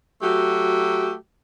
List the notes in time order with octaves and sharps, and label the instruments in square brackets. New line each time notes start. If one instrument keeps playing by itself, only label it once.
[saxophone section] F#3 A3 F#4 G4